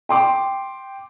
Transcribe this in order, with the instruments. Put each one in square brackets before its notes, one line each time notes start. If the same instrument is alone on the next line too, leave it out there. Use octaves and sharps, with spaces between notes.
[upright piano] G5 C6 D6